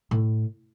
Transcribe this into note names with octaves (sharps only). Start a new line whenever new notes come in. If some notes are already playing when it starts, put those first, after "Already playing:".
A2